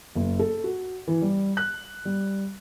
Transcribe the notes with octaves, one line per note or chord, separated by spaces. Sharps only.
F#1
A4
F#4
E3
G3
F#6
G3